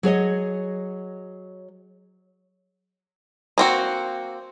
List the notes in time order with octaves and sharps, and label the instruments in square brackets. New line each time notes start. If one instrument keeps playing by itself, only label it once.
[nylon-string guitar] F#3 G#4 C#5 D#5
[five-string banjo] A#3 C4 F#4